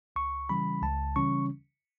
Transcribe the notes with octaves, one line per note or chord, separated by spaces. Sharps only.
C#2 C#6
C#3 E3 G3 C#4 B5
C#2 A5
C#3 E3 G3 C#4 C#6